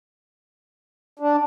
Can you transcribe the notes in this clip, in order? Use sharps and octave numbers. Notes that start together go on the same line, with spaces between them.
D4